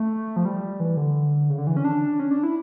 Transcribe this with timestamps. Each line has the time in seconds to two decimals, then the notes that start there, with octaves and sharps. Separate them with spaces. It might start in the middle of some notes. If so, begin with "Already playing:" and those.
Already playing: A3
0.36 F3
0.45 G3
0.80 E3
0.97 D3
1.50 C#3
1.58 D3
1.67 E3
1.77 C#4
1.84 D4
2.20 C#4
2.31 D4
2.43 E4